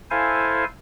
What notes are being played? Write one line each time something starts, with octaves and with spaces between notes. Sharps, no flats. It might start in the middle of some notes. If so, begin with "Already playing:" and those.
E4 A4 C5 F5 G#5